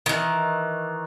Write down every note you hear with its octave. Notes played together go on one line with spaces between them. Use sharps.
D#3 E3